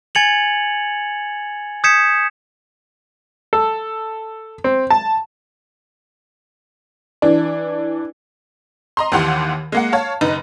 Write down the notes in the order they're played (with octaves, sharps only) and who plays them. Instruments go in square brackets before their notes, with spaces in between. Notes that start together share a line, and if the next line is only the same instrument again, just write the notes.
[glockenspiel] G#5 G#6 A6 C#7 F7 F#7
D#6 G6 G#6 B6 C#7 E7
[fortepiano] A4
C4
A5
[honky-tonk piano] E3 D4
D#5 A#5 C6
D#2 E3 G4 F#5 C6
G#3 A#3 F#5
C#5 F5 A5
F#1 D#4 B4